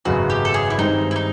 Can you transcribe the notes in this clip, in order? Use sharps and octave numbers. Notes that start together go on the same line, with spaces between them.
G#1 F#2 C#3 F#3 B3 F#4
G4
A4
G#4
E4
G2 D#3 G#3 C4 D#4
E4
D#4